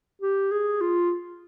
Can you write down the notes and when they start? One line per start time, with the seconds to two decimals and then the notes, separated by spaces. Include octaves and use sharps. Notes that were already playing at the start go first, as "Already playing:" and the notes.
0.22 G4
0.51 G#4
0.81 F4